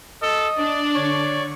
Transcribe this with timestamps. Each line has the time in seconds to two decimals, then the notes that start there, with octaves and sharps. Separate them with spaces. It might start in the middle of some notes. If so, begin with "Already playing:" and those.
0.22 A4 D#5
0.58 D4 D5
0.95 D3 C#5 C#6